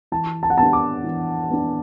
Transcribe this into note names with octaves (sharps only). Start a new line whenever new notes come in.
E3 A5
A5
F#5
B3 D4 A5
D6
E3
B3 D4